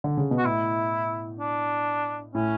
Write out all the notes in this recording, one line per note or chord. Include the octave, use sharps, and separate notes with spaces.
D3
C#3
B2
F#4
A2 E4
D4
A2 C#4